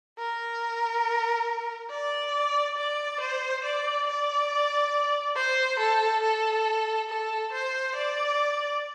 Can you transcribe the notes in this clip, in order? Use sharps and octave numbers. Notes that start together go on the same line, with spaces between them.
A#4
D5
D5
C5
D5
D5
C5
A4
A4
A4
C5
D5